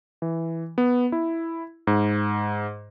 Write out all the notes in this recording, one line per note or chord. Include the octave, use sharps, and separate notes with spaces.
E3
B3
E4
G#2